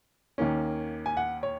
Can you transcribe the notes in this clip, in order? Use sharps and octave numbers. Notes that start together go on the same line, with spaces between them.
D#2 D#3 A#3 C#4
G#5
F#5
C#5